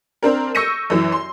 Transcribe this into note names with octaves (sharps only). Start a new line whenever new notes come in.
C4 D4 A#4
C#6 E6 G6 A#6 C#7 D#7
F#2 E3
C6